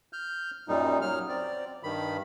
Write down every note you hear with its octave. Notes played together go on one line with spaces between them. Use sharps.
F6 G6
F#2 A#2 G3 D#4
F#3 F6
C4 D5
G2 D#3 B5